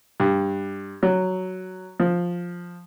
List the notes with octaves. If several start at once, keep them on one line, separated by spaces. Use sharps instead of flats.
G2
F#3
F3